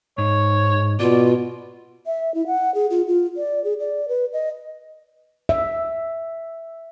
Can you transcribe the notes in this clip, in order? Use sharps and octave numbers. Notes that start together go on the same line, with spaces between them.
G#2 C#5
B2 F4 D5
E5
E4
F#5
G#4
F4
F4
D5
G#4
D5
B4
D#5
E5